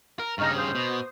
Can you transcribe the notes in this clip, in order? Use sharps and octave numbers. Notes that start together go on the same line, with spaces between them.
A#4
G2 C#3 D#4 C#6 F6
C5 D#6
B2